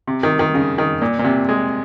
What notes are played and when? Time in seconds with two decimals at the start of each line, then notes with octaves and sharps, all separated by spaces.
0.07 C3
0.23 D#3
0.39 D#3
0.54 C#3
0.78 D#3
1.02 A#2
1.19 A#2
1.24 C3
1.49 G#3